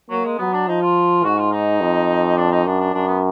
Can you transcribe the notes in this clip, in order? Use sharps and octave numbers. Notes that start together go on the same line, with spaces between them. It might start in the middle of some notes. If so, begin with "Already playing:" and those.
F#3 A#3
G#3
F#3 B3
D4
F3 D#4
F4
G#2 F#4
F4
D#4
F2
D4
D#4
F#2 D4
D4
F#2 D4
B3